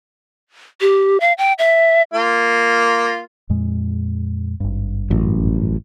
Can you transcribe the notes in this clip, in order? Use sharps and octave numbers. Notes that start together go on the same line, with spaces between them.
G4
F5
G5
E5
A#3 F4
F2 A#2 G#3
G#1 G2
A1 F#2